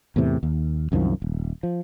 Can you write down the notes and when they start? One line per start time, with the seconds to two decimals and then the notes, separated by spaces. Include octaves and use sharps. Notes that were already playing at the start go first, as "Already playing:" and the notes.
0.16 E2 A2 C3 E3
0.43 D#2
0.92 C2 F#2 D#3 F3
1.22 D#1
1.63 F3